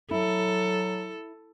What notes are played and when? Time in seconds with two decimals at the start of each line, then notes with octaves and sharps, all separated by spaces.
0.11 F#3 E4 A4